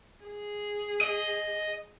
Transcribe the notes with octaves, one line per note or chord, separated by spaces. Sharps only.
G#4
D#5